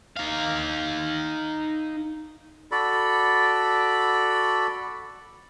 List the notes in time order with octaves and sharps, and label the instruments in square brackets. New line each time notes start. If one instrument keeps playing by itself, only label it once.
[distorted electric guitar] D#4 F5
[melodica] F#4 A4 D5 B5